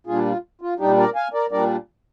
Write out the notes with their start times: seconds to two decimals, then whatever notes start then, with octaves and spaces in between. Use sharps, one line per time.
0.07 A#2 G3 D4 F4 G#4
0.25 F4
0.61 F4
0.79 A#2 G3 D4 D#4 G4
0.97 A#4 D5
1.15 F5 G#5
1.33 A#4 D5
1.51 A#2 G3 D4 A#4 D5